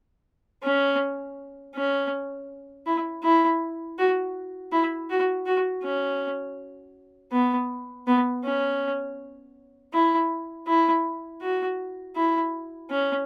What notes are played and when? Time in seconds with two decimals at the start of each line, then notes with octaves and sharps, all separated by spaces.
0.63 C#4
1.75 C#4
2.86 E4
3.23 E4
3.98 F#4
4.72 E4
5.10 F#4
5.46 F#4
5.84 C#4
7.32 B3
8.07 B3
8.44 C#4
9.93 E4
10.67 E4
11.42 F#4
12.16 E4
12.91 C#4